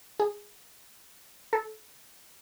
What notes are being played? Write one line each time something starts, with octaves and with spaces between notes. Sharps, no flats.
G#4
A4